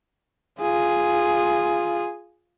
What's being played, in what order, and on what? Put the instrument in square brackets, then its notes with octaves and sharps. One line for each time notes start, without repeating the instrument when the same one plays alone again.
[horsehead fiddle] F4 G#4